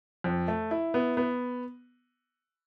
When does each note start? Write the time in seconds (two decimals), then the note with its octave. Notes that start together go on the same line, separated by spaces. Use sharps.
0.24 F2
0.48 A3
0.71 E4
0.94 B3
1.17 B3